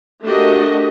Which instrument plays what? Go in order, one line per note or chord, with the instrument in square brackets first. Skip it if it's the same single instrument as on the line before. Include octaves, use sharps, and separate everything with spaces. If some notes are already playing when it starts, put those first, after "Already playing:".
[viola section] A3 D4 F#4 G4 A#4 D#5